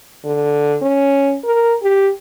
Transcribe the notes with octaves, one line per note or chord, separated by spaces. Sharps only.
D3
C#4
A#4
G4